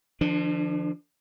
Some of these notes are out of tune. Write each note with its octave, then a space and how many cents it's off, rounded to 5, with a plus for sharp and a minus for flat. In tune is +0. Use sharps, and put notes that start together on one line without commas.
D3 +45 F3 -15 D4 +0